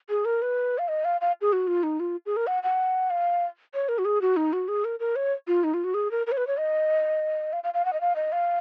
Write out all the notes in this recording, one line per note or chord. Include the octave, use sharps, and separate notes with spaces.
G#4
A#4
B4
F5
D#5
F5
F5
G#4
F#4
F4
D#4
F4
G#4
A#4
F#5
F#5
F5
C#5
A#4
F#4
G#4
F#4
D#4
F#4
G#4
A#4
A#4
C#5
F4
D#4
F4
F#4
G#4
A#4
A#4
C#5
B4
C#5
D#5
F5
F5
F5
F#5
D#5
F5
D#5
F5